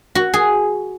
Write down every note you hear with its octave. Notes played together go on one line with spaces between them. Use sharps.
F#4
G#4